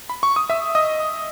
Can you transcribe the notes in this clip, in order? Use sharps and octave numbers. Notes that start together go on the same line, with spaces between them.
B5
C#6
D#6
E5 E6
D#5 D#6